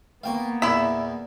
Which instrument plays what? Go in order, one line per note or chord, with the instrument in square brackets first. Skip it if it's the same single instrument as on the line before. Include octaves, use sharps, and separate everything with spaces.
[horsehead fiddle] A#3 B3 [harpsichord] F5 G5 C#6
[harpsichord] E2 A#2 [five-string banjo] E4 E5